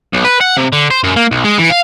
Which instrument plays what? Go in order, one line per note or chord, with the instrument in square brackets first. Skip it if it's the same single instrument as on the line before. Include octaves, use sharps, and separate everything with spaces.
[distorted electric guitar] B1
B4
F#5
C3
D3
C5
F#2
A#3
B1
G#3
E3
F5